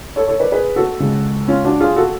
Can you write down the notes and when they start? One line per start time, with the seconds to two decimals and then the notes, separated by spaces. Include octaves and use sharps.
0.16 A4 C#5
0.28 A4 C#5
0.40 B4 D5
0.52 G#4 B4
0.76 F#4 A4
1.00 C#2 C#3 G#3
1.48 C#4 F4
1.64 D4 F#4
1.80 F4 G#4
1.96 F#4 A4